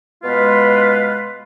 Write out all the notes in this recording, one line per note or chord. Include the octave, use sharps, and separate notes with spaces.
B2 G#3 F4 B4